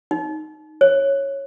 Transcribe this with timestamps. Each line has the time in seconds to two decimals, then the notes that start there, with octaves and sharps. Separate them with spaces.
0.11 D#4
0.81 C#5